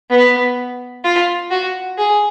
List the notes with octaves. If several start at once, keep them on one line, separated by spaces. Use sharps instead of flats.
B3
F4
F#4
G#4